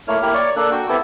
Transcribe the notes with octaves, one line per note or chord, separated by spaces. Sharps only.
A3 A#3 E4 C#5 F6
A#3 E4 G4 F6
C#5 D5 C#6
A#3 D4 A4 F#6
F#4 G5
B3 C4 E4 G4 A4